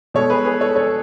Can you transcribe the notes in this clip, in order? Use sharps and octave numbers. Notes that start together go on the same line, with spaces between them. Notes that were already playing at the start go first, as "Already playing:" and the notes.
B2 G#3 A4 C#5
G#4 B4
G#4 B4
A4 C#5
A4 C#5